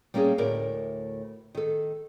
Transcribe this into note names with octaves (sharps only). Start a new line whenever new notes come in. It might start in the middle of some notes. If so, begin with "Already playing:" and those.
G3 A#3 C#4 F4 G#4
D2 A2 A#4 D5
D#3 A4